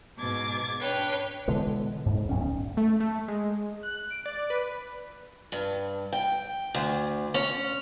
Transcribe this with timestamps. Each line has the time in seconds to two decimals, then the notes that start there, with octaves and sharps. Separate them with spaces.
0.18 G#2 B2 D6 G#6 A6
0.81 D4 B4 C#5 G5
1.48 B2 D3 E3 G#3
2.06 G#2
2.29 D1 B1 C#4
2.77 A3
3.00 A3
3.28 G#3
3.83 F#6
4.10 D7
4.26 D5
4.50 B4
5.52 G2
6.13 G5
6.75 D2
7.34 C#4